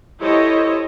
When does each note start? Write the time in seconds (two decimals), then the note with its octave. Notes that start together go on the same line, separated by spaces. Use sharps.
0.22 E4 G4 A4 C5 C#5 D#5